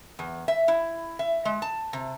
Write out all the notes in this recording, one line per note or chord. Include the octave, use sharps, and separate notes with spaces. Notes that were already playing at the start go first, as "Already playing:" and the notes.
E2
E5
E4
E5
G#3
A5
C3